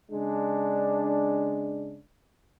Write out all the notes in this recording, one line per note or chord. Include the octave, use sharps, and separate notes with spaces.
C#3 G#3 D4